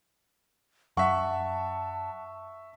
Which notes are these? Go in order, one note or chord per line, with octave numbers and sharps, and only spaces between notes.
F#2 E5 F#5 A5 C#6